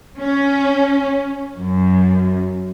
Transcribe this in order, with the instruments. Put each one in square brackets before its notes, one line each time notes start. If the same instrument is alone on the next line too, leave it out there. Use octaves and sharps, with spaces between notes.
[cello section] C#4
F#2